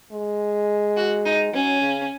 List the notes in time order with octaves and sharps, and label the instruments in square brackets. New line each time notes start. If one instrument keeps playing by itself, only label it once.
[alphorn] G#3
[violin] F#4
D#4
[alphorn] F#3 [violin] C#4
[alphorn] C#3